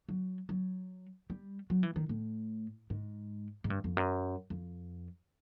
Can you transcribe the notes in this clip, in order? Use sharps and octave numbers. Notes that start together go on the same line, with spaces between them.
F#3
F#3
G3
F#3
E3
D#3
A2
G#2
G#2
G2
F2
F#2
F2